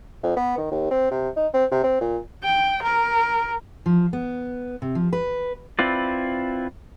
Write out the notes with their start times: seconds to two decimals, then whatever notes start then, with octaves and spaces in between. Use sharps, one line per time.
0.23 F2
0.36 B3
0.58 D#3
0.71 D#2
0.91 C4
1.11 C3
1.36 D#4
1.54 C4
1.71 C3
1.84 C4
2.01 A#2
2.43 G5
2.83 A#4
3.86 F3
4.13 B3
4.82 C3
4.95 F3
5.13 B4
5.79 C4 E4 F4 B4 D5